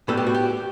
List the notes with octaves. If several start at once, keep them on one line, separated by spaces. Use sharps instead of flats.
A2 G3 B3 A4
G4
F#4
G4